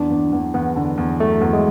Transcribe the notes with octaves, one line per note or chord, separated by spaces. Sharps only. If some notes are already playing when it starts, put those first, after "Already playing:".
Already playing: E2 D4
E2
E2
E2 B3
D3
E2
F#3 A3
E2
G#3